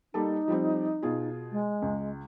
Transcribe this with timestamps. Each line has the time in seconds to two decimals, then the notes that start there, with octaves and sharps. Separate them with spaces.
0.14 G3 A#3 D#4 A4
0.48 F3 G3 C4
1.02 B2 F4 G#4
1.52 G#3
1.82 C#2